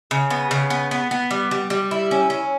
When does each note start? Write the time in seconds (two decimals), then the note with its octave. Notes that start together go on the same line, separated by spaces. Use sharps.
0.11 C#3
0.30 B3
0.51 C#3
0.70 B3
0.91 B3
1.11 B3
1.31 G3
1.51 G3
1.70 G3
1.91 E4
2.11 C#4
2.30 C#4